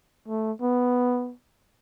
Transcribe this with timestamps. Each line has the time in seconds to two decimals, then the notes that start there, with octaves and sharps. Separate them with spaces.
0.28 A3
0.62 B3